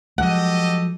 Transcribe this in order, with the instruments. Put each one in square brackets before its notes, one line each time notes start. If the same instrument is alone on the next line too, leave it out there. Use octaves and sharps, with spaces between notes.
[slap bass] F3 F#3 G#3 [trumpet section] G4 A4 D#5 [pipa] F#5